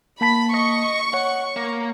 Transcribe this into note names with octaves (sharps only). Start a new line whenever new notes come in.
A#3 A5 B5 B6
D#5 C#6
C#5 F#5
A#3